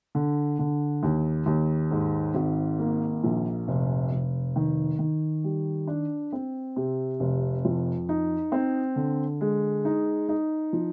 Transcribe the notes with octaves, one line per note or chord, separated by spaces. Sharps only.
D3
D3
D#2
D#2
G#2
G#1
A#3
A#1
F1
F1
D#3
D#3
G3
D4
C4
C3
F1
F2
D#4
C4
D3
G#3
D#4
D#4
F3